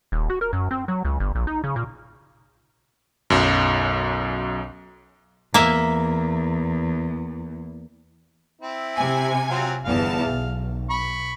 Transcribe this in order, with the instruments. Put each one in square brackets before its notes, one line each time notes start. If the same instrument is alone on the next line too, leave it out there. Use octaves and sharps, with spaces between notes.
[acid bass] D#1
F#4
A#4
F#2
C4
F#3
C#2
G1
A#1
D#4
C#3
A#2
[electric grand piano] B1 F#2
[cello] E2 [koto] A#3 E5
[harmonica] C4 E4
[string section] C3 G#5
[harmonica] F#3 C4 F4
[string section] G1 E2 A5 [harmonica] F5
[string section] B1
[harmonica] B5 C#6